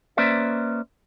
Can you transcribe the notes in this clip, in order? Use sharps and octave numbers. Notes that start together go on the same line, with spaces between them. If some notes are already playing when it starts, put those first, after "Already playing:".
A#3 C#4 B4 C5 D5 E5